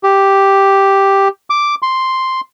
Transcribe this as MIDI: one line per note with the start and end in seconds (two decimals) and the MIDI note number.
0.03 1.28 67
1.50 1.75 86
1.82 2.41 84